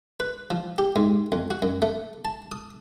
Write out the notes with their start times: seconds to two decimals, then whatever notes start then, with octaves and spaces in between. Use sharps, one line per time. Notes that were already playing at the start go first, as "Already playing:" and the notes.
0.20 B4
0.50 F3
0.78 G4
0.96 G#2
1.32 F2
1.51 F#4
1.62 F#2
1.82 A3
2.25 A5
2.52 D#6